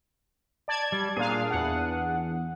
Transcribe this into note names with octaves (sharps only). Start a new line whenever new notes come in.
D5 A5 G#6
G3
A#2 D4 G#4 F5
E2 F#5